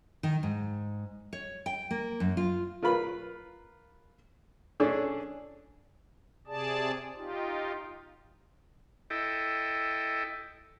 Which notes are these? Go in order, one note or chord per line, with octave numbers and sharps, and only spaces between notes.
D#3
G#2
C#5
G5
A#3
F#2
F4
F4 A#4 B4 B5
C#4 D4 G#4 A4
C3 G#4 D5 A5
D#4 F4 G4
E4 A4 D#5 G5